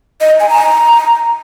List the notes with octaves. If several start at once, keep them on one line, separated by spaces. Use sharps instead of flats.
D#5
G#5
A#5